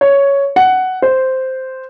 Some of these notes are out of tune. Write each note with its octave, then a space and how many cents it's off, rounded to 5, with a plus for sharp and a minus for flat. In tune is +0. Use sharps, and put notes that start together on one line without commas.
C#5 +5
F#5 +10
C5 -5